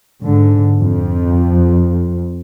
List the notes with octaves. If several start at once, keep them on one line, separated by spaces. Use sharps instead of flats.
G#2 D3
F2